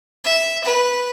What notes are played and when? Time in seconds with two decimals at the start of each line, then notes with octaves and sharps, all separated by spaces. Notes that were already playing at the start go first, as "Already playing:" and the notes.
0.24 E5
0.64 B4